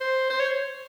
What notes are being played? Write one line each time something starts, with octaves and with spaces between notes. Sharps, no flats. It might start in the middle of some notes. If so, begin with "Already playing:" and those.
C5
C5
C#5